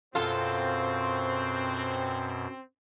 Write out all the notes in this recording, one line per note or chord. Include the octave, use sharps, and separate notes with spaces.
F#2 B2 C4 F4 A4 C5